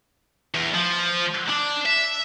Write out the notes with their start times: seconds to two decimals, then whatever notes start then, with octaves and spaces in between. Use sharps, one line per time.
0.54 E2
0.74 F3
1.50 D4
1.85 E5